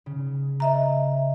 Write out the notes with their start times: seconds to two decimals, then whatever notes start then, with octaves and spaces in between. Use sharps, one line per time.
0.06 C#3
0.60 D#5 E5 A#5